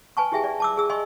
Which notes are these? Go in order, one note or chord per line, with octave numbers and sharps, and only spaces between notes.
B4 G#5 A5 C#6
E4 G4 G#4 E5 G5 G#5
D5
A5 D6 E6
G#4 E6
D#5 G#5 C6 C#6